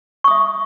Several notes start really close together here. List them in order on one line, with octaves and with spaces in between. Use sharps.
C#6 D#6 E5